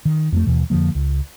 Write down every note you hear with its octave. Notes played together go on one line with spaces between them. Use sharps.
D#3
F2 G#3 A3
D#2 B2 E3
F2 D3 F3 A#3
C#2